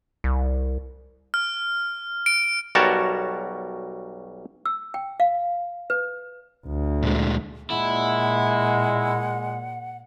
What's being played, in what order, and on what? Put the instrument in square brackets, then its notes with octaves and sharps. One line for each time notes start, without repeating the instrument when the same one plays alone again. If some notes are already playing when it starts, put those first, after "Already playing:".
[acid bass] C2
[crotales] F6
D7
[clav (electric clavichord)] B1 G3 F#4 A#4 C#5 A5
[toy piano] E6
G5
F5
B4
[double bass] D2
[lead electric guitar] A#2 G#3
[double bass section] A#2 [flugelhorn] G#3 [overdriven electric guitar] E4 [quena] F#5